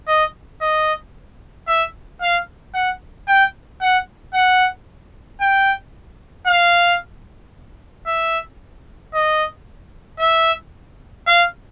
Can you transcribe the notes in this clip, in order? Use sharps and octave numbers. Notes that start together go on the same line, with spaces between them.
D#5
D#5
E5
F5
F#5
G5
F#5
F#5
G5
F5
E5
D#5
E5
F5